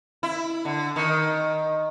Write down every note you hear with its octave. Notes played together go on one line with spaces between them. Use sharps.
E4
D3
D#3